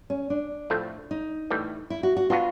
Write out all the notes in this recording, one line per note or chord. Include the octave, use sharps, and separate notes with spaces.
C#4
D4
A2 F3 A3 C4 F4
D#4
A2 E3 G3
E4
F#4
F#4
B3 D4 F4 F#4 B4